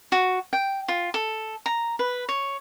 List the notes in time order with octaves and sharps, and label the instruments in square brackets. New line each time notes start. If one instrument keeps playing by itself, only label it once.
[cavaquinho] F#4
G5
F4
A4
A#5
B4
C#5